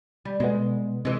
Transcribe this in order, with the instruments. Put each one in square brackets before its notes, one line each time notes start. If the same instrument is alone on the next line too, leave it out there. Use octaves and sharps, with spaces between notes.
[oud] G3
[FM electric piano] B2 B3 [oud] G#3
[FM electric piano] C3 [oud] E3 G#3